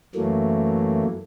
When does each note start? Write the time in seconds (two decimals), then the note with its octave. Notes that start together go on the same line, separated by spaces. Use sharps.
0.15 F#2 E3 F#3 A3 A#3